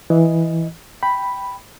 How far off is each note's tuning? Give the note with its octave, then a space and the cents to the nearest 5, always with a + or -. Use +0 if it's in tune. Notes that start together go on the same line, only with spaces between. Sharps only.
E3 +0 D#5 +0
G5 +0 B5 +0